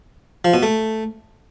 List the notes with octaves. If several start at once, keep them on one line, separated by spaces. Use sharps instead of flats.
F3
B2
A3